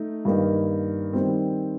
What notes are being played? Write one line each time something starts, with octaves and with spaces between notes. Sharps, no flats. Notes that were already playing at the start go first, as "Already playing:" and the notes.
Already playing: A3 D#4
G2 D#3 A#3 D#4
D#3 G3 C4